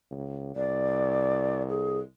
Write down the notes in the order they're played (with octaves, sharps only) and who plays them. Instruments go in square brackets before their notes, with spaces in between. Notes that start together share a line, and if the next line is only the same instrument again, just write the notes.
[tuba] C#2
[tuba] C2 [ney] D5
[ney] G#4